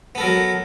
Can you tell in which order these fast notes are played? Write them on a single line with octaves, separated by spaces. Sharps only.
B3 A4 A#4 F#3